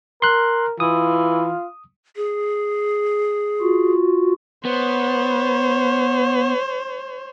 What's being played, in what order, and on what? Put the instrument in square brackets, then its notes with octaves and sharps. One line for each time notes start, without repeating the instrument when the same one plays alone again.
[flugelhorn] A#4 [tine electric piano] C6 F#6
[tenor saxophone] E3 [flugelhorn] F4 [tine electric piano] D#6
[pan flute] G#4
[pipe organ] F4 F#4
[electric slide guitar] B3 [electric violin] C5 C#5